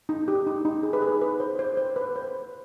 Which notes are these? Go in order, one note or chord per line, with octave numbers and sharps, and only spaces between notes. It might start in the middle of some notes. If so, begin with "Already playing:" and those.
D#4
G4
D#4
D#4
G#4
B4
G#4
B4
C5
C5
C5
B4
C5